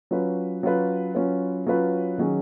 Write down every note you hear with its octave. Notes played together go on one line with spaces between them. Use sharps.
F#3 C#4 F4 B4
F#3 C#4 F4 B4
F#3 C#4 F4 B4
F#3 C#4 F4 B4
D#3 F#3 C#4 G#4